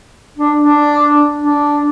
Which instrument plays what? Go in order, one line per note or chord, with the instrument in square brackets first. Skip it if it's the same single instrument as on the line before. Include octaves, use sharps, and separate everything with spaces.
[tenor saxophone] D4
D4
D4